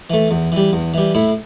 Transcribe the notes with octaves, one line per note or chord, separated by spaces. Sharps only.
E3 A3
E2
E3 G3
E2
E3 G3
A2 E4